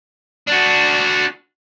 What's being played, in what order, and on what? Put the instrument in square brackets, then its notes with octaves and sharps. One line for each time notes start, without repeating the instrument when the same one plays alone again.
[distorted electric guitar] D4 F#4